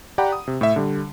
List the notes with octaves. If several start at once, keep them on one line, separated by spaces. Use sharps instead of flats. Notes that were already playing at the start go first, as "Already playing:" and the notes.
G4 D5 F#5 G5 A#5 B5
D#6
C3
A2 E5
D3 G3